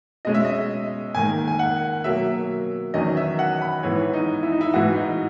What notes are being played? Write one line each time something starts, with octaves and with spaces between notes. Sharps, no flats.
B2 G#3 C#4 D#5
E5
D#5
G#2 D#3 A#3 G#5
G#5
F#5
B2 F#3 A#3 E5
E2 D#3 F#3 C#4 D#5
E5
F#5
B5
G#2 E3 B3 C#5
D#4
E4
D#4
E4
G#2 E3 B3 F#4
D#4